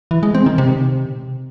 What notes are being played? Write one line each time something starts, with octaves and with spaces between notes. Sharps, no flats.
E3
G#3
C4
D#3
C3